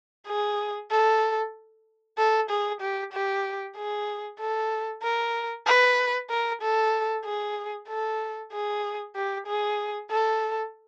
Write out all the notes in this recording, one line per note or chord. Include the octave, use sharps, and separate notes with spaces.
G#4
A4
A4
G#4
G4
G4
G#4
A4
A#4
B4
A#4
A4
G#4
A4
G#4
G4
G#4
A4